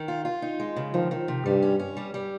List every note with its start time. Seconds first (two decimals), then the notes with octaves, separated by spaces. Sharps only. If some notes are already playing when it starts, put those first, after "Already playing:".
Already playing: D#3
0.08 F4
0.25 F4
0.42 D#4
0.59 G#3
0.76 C#3
0.93 D#3 F3
1.11 D#3
1.28 C3
1.45 G2 G3
1.62 C#4
1.79 C#4
1.97 G3
2.14 G3